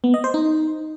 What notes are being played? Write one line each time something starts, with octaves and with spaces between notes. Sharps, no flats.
B3
D#5
C5
D#4